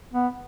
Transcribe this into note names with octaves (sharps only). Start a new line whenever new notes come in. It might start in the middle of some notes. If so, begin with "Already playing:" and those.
B3